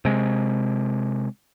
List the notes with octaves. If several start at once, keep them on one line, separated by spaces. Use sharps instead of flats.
C3 G#3